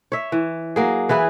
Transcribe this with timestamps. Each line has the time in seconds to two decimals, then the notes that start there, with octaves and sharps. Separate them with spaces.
0.12 C#5 E5
0.32 E3
0.76 F#3 A#3 G#4
1.09 E3 E4 G#4 B4